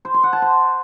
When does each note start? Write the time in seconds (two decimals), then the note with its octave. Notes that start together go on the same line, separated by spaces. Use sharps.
0.05 C5
0.14 C6
0.23 F#5
0.33 A5
0.42 C5